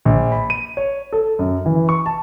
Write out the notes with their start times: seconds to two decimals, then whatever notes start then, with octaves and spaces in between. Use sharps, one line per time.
0.05 A#1
0.32 B5
0.50 D#7
0.77 C#5
1.13 A4
1.39 F#2
1.66 E3
1.89 C#6
2.06 A5